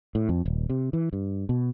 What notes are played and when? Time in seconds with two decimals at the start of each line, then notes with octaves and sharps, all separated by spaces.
0.15 A2
0.29 F2
0.46 D#1
0.70 C3
0.93 E3
1.13 G2
1.49 B2